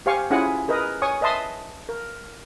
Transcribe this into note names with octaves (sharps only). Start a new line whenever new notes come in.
G4 C5 F5 G#5 C#6
C#4 E4 F4 G#4 F#5 G#5
G#4 A#4 B4 D#5
C#5 G#5 C#6 D#6
B4 D#5 E5 A5 C6 D#6
A#4